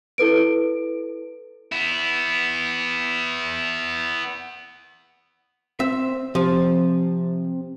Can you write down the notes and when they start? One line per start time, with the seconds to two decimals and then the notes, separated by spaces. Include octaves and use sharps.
0.18 E4 A4 B4 D7
1.72 B3 E4
5.80 C4 E5
6.35 C3 F3